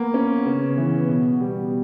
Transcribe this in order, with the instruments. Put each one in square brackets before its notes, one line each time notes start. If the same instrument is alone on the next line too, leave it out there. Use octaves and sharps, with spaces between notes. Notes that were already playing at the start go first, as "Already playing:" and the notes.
Already playing: [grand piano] A#3 [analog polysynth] B3
[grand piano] C#4
C#3
E3
B2
G3